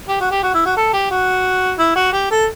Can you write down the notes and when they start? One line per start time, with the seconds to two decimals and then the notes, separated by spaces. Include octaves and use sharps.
0.08 G4
0.20 F#4
0.31 G4
0.43 F#4
0.54 E4
0.66 F#4
0.76 A4
0.93 G4
1.11 F#4
1.79 E4
1.96 F#4
2.13 G4
2.31 A4